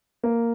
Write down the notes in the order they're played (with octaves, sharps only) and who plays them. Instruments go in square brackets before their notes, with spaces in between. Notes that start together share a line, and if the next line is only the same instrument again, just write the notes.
[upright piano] A#3